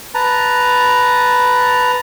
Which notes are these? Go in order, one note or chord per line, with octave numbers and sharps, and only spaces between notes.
B4 A5 A#5